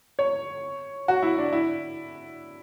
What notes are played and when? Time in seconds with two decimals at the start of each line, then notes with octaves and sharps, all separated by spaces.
0.19 C#5
1.08 F#4
1.22 E4
1.38 D4
1.52 E4